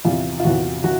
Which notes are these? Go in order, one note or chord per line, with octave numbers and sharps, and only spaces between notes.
E2 C3 E3 F4
F4
E2 C3 E3 F#4
E3 F#4